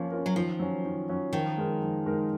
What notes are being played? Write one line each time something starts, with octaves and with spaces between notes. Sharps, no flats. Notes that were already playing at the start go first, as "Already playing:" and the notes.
Already playing: F3 A#3 C#4 F4
C#4 F4 A#4
F#3
D#3 F3
F#3 C#4
D#3
F#3 C#4
D#3 F3
G#3 D#4 A#4
F3
G#3 D#4 A#4